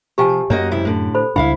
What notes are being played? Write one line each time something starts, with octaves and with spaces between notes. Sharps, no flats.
C3 F3 G4 G5 G#5
F#2 A#3 F#4 C#5 D#5
G#2 C3 E4
A2 D3
A4 C5 B5
C#2 G3 D4 E4 F5 F#5 B5